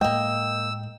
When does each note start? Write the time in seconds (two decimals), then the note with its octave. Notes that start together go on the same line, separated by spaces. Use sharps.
0.01 A2 G#3 A#3 D#5 G5 E6